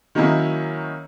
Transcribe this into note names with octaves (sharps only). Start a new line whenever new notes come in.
D#3 F#3 A#3 C#4 D#4 E4